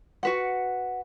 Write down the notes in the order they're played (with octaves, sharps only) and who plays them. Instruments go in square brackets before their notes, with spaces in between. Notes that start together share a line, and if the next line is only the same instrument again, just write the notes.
[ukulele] F#4 B4 F#5